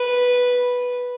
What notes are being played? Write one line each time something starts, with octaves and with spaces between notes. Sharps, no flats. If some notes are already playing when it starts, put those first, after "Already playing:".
Already playing: B4